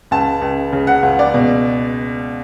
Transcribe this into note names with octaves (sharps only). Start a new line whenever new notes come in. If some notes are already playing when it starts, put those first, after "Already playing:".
C#2 A5
C#2
C#3
F#5
C#2
D5
B2